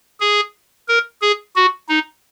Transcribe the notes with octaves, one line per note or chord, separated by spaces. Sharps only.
G#4
A#4
G#4
F#4
D#4